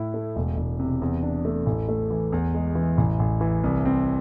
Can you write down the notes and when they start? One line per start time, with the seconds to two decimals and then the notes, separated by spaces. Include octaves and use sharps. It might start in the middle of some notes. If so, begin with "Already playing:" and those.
Already playing: A2 E4
0.14 A3
0.36 E1
0.57 E1
0.80 C3
1.02 E2
1.23 D4
1.45 A3
1.66 A1
1.89 A3
2.10 E3
2.32 E2
2.55 G#3
2.75 E3
2.98 A1
3.19 A1
3.41 E3
3.64 C2
3.85 C4